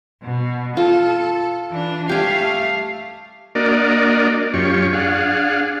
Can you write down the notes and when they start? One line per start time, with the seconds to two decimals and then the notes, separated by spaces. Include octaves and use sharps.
0.23 B2
0.77 F4 A4
1.70 E3 D4
2.09 A3 G4 F5 G#5
3.55 A#3 D4 F#4 A#4 D5 D#5
4.54 F#2 C#4 F4 G4 C#6
4.93 D4 G#4 F5 F#5